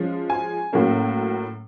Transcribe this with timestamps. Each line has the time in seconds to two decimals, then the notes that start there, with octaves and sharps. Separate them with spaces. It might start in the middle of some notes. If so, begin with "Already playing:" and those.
Already playing: F3 G#3 C#4
0.30 G#5
0.73 A2 F#3 A#3 C#4